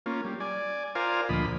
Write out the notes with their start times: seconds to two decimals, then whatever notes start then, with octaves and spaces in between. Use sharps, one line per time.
0.06 A#3 C#4 F4
0.24 G3
0.40 D5 G#5
0.95 F4 A#4 C5 D5 F5 G#5
1.29 D2 A#2 F3 D#5 B5